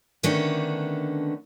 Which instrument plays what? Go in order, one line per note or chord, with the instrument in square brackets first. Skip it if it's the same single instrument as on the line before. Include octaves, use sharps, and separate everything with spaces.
[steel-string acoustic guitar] D3 D#3 A3 B3 C#4 D4